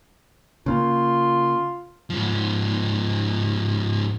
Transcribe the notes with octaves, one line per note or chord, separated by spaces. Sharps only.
C#3 A#3 F4
G#2 F3